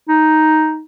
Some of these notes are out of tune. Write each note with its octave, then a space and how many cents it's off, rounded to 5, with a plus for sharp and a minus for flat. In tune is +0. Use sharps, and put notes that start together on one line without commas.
D#4 +5